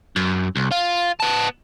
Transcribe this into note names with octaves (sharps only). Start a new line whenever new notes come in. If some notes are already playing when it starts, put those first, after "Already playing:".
F#2
C2
F4
B3 A5